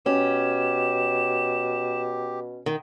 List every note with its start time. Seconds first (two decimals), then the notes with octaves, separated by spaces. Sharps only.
0.06 B2 C#4 G4 E7
2.66 D#3